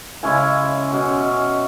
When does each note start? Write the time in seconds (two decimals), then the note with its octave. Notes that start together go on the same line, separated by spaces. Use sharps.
0.23 C#3 G#3 C#4 E4 G#5
0.92 B2 G#3 C#4